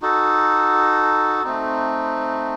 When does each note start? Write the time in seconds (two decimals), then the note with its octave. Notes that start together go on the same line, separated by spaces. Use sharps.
0.02 D#4 F#4 A4
1.44 A3 C4 D#4